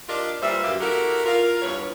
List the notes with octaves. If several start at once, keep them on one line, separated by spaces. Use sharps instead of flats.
D4 F4 G4 A#4 D5 D#5
A#2 G3 B4 C5 E5
F#2 A#3 G4
E4 F#4 G4 A4 A#4
F4 A#4
E2 G2 B4 C#5